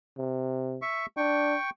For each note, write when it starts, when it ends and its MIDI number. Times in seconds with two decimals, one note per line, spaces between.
0.17 0.79 48
0.82 1.06 76
0.82 1.06 85
1.17 1.55 62
1.17 1.70 79
1.17 1.70 85